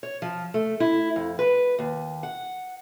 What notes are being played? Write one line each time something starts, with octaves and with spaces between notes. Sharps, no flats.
C#5
F3
A3
E4
F2
B4
D#2
F#5